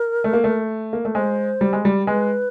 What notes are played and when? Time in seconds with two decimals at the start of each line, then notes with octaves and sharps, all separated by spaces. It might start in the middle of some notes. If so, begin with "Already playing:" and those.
Already playing: A#4
0.24 A3
0.33 A#3
0.44 A3
0.93 A#3
1.05 A3
1.15 G#3 C5
1.61 G3
1.73 G#3
1.85 G3
2.07 G#3 B4